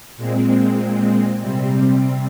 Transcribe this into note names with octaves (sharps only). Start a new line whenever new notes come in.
A#2 G#3 C4
C3 G3 C4